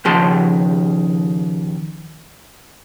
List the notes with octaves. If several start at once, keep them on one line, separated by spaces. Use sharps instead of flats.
D#2 C#3 F3 G4 A5 C6